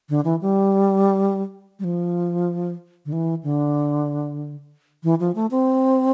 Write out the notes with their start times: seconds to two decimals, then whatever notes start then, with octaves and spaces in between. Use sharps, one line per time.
0.09 D3
0.25 E3
0.41 G3
1.79 G3
1.84 F3
3.05 D3
3.13 E3
3.43 D3
5.04 E3
5.20 F3
5.35 A3
5.51 C4